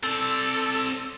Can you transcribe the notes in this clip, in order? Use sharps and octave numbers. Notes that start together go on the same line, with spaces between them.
C4 A4 D5